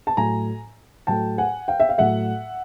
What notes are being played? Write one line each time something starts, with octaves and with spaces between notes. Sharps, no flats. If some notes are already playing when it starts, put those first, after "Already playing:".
A5
A2 F#3 A3 G#5 A#5
A2 F#3 A3 G5 A5
F#5 G#5
F5 G5
E5
F5
A2 F#3 A3 E5 F#5